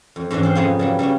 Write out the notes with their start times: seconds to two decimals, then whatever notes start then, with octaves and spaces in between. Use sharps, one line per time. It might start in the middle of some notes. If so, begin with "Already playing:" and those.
0.16 F2
0.31 G#2 E3 C#4 D4
0.43 C4 F4 C5
0.55 F2 C#3 F3 B3 D#4 G#4
0.79 C#3 F#3 G3
0.99 C#3 G3 B3 C#4